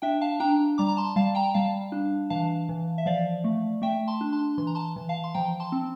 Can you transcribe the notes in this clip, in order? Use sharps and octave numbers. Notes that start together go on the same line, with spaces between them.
D4 E5 G5
F5 A5
D4 G5 A#5
G3 A#5 D6
A#5
A5 C6
G3 F5 A5
G5 A#5
G3 F5 A5
D4
E3 F5 A5
E3
E5
F3 D5 F5
A3
A3 E5 G5
A5 C6
D4
A5 C6
E3 C6
A#5
A5 C6
E3
F5 A5
C6
F3 G5 A#5
A5 C6
C4